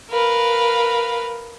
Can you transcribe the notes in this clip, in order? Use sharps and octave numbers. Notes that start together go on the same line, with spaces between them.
A#4 B4 F5